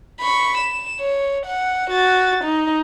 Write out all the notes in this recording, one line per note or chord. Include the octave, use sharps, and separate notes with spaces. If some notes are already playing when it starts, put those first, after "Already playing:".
B5 C#6
E7
C#5
F#5
F#4 A6
D#4